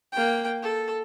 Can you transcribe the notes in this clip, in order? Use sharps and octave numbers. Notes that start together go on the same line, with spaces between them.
A#3 G5
A4